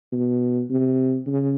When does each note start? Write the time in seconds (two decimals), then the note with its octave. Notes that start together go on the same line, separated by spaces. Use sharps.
0.12 B2
0.70 C3
1.27 C#3